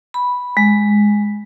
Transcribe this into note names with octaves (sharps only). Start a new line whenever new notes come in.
B5
G#3